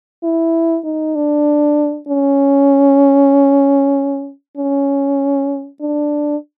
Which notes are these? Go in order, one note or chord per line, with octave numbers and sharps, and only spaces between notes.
E4
D#4
D4
C#4
C#4
D4